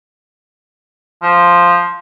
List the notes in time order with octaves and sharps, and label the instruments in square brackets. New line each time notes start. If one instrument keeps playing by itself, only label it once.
[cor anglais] F3